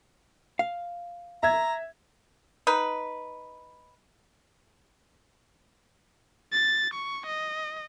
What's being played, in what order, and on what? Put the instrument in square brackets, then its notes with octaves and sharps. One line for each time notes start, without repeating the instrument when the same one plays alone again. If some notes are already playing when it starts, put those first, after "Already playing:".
[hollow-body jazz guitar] F5
[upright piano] E5 G#6 [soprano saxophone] A#5
[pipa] D#4 B4
[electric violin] A6
C#6
D#5